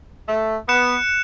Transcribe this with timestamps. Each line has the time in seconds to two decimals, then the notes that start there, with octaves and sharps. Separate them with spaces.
0.29 A3
0.68 B3 F#6 C#7 E7